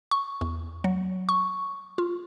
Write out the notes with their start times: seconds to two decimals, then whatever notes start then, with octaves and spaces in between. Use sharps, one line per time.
0.11 C#6
0.41 E2
0.84 F#3
1.29 C#6
1.98 F4